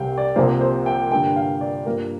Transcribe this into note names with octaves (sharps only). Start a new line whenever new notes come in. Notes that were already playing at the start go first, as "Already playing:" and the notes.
Already playing: C2 C3 G3 C4 F5 G5
D5
C2 C3 F3 A#3 C5
C5
G5
G2 D3 A#3 G5
F5
D5
G2 F3 A#3 A#4